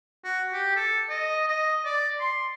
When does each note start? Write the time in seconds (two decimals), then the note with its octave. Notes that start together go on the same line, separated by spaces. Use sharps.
0.24 F#4
0.53 G4
0.76 A4
1.09 D#5
1.48 D#5
1.85 D5
2.20 C6